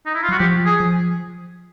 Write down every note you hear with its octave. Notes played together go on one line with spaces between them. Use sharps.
D#4
E4
F4
F#3 F#4
F3 G4
G#4
F3